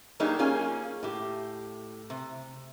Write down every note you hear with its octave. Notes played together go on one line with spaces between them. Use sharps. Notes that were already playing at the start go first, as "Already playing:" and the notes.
F#3 A#3 D4 D#4 G4 G#4
A#3 C#4 F4 G#4 G#5
A2 G4
C3